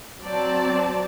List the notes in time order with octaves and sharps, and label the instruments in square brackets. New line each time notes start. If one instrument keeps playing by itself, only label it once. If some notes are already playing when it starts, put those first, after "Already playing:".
[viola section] F#3 C4 D5 A5